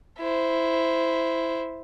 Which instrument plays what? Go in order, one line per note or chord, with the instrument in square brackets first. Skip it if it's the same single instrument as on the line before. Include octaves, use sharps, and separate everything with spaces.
[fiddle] E4 C5